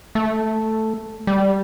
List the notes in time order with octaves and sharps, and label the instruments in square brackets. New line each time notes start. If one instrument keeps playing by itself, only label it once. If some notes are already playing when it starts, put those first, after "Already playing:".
[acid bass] A3
G3